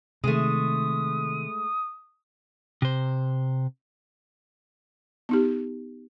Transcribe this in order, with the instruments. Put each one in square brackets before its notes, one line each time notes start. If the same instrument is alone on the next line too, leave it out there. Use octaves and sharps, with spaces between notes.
[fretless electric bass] C3 D#3 [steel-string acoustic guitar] G#3 A3 [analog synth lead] D#6
[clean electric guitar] C3 C5
[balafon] B3 D#4 G4